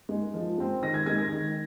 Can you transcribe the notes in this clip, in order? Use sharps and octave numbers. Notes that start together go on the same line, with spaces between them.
G#3 D#4
F3
G#3 C4
D#3 A#6
G#6
G#3 D#4 G#6
A#6
D#3